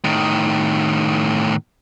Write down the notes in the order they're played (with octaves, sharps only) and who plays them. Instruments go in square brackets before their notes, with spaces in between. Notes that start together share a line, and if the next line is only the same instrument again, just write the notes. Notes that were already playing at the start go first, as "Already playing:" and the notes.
[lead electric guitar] A2 D#3